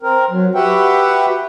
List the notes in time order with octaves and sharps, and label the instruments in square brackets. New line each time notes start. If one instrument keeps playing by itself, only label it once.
[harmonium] C4 A#4
F#3
F#4 G4 B4 E5 F#5 G5